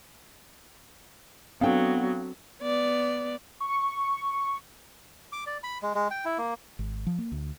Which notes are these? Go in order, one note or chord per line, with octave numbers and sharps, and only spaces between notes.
F#3 B3 C4 D4 A4 F5 G5
B3 D5
C#6
D6
D5
B5
G#3
G#3
G5
E4
A#3
G#1
F3
A#3
D2